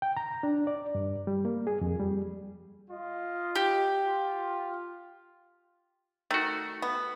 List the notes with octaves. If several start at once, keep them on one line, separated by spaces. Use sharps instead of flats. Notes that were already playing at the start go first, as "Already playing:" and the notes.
G5
A#5
D4
D5
G2
G3
A#3
G#4
F2
G3
F4 D#5
G4
F4
D#3 A3 F#4
B3